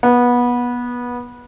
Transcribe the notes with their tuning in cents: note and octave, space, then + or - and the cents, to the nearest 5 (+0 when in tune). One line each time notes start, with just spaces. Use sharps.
B3 -20